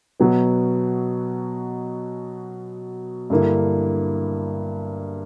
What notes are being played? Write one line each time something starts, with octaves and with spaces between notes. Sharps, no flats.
B2 F#3 B3
G2 D3 A#3 E4